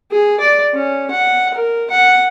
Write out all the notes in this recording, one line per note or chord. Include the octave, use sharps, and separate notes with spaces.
G#4
D5
C#4
F#5
A#4
F#5